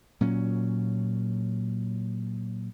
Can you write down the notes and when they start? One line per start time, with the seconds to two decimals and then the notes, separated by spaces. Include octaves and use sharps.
0.21 A#2 F#3 C#4